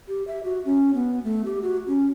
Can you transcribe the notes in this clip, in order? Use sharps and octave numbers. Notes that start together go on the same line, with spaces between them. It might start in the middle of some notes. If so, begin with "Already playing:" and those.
G4
E5
F#4
C#4
B3
A3
G4
F#4
C#4